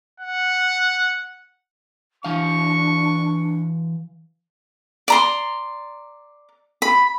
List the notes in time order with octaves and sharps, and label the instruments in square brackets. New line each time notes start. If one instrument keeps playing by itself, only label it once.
[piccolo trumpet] F#5
[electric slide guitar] E3 F5 [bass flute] D4 [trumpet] C#6
[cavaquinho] D5 A#5 C6
B5